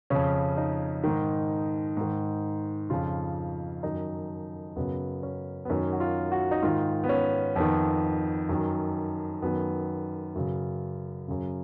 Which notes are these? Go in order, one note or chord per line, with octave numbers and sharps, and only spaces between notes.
F2 C#3 C#4
D#4
G#2 D#3
G#2 D#3
F2 C#3 F4
F#2 D#3 D#4
F#2 C#3 B3
C#4
B3
F#2 D#3 C#4
F#4
F4
F#4
D#4
G#2 D#3 F4
B3
C#4
F2 D#3 B3
F#2 D#3
F#2 D#3 B3
F#2 C#3
F#2 C#3